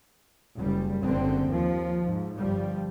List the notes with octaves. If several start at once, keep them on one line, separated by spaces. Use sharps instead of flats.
F#1 G3
F#1 D3 C4
D#2 F3
G#2
G1 F3 G3